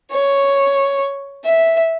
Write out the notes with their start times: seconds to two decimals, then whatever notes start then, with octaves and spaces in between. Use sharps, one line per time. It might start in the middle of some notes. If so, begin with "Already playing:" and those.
0.11 C#5
1.44 E5